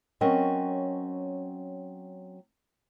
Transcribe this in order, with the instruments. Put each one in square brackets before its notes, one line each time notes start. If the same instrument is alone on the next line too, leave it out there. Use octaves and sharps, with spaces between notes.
[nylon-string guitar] F#3 C4 C#4 A#4 D#5